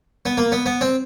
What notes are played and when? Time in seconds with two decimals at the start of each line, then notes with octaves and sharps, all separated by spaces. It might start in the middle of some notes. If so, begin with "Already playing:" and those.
0.26 B3
0.38 A#3
0.52 B3
0.66 B3
0.81 C4